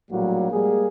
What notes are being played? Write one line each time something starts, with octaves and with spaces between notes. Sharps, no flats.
A#1 A2 F#3 G3 A#3 F#4
G3 G#3 A#3 G#4